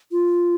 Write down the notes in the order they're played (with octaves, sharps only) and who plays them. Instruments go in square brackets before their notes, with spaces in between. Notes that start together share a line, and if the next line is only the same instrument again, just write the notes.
[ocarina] F4